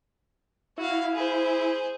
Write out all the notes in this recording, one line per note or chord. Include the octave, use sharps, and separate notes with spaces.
E4 F#4 F5
G#4 C5